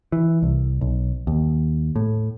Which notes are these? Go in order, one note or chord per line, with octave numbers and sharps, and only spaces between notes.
E3
C2
B1
D#2
A2